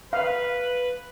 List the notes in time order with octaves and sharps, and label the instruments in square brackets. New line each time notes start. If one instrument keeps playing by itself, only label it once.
[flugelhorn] B4 [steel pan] F5